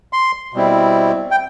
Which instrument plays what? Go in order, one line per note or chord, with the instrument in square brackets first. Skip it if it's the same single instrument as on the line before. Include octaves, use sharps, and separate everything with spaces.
[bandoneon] C6
B2 G3 C4 E4
G5